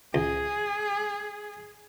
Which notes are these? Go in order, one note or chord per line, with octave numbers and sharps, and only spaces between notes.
C#2 G#4